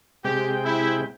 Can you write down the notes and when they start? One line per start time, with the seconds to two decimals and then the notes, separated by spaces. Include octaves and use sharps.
0.24 C3 G#3 G4 G5
0.65 E4